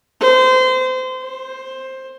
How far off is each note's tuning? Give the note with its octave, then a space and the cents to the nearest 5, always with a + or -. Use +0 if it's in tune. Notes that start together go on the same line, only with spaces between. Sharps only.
C5 -25
C5 +10